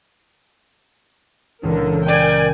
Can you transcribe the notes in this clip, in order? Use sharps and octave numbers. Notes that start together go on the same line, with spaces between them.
C#2 A#2 D3 E3 A#4
A#4 D5 G5 G#5